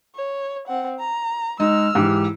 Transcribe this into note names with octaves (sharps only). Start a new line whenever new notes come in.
C#5
C4 F#5
A#5
G#3 D#4 E6 F6
G#2 E3 G4